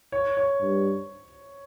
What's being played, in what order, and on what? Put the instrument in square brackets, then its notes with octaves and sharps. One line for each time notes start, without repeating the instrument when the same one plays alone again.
[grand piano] C#5
C#5
[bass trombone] G2